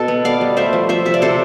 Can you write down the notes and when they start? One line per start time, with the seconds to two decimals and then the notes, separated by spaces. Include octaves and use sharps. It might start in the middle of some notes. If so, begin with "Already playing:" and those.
Already playing: B2 A4
0.08 B3
0.25 B3 D5 F5
0.41 G3
0.57 A3 C5 E5
0.73 F3
0.89 F3 C5 E5
1.05 C3 E5
1.14 D5
1.22 C3 A4 C5